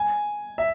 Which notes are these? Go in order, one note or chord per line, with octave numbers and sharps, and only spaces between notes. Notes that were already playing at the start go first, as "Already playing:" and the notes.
Already playing: G#5
E5